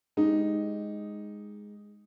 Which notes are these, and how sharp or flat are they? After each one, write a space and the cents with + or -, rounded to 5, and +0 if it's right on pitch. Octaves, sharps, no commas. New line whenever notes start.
G#3 +0 D#4 +0 G4 +0